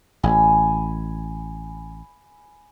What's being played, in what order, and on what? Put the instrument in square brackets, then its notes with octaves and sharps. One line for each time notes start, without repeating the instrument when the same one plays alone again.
[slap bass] A1 [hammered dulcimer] G#5 B5